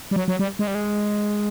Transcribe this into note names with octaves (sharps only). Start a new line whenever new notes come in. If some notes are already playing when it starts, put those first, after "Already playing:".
G3
F#3
F#3
G3
G#3
G3
G#3